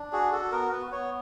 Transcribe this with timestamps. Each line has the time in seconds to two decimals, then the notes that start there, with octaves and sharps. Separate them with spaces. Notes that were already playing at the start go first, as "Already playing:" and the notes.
Already playing: D4
0.13 F#4 G#4
0.32 F#4 A4
0.52 B3 A#4
0.72 B3 B4
0.92 B3 C#5